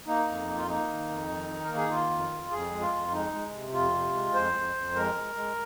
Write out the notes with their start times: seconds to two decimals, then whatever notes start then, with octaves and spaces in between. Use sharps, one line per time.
0.07 A#3 D#4
0.27 F2
0.47 A#3
0.57 F4
0.68 A#3 D#4
0.88 D#3
1.08 F2
1.29 D#3
1.49 D#3
1.64 A#3 A#4
1.77 G#4
1.90 D#3 F4
2.10 F2
2.31 F2
2.51 F2 G#4
2.71 G#3
2.81 F4
2.92 F2
3.12 G#3 D#4
3.32 G#3
3.53 C3
3.73 F2 F4
3.93 C3
4.13 G#3
4.34 F2 C5
4.54 F2
4.75 F2
4.95 G#3 A#4
5.15 G#3
5.35 G#3